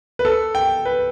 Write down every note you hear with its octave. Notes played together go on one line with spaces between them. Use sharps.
B4
A4
G5
B4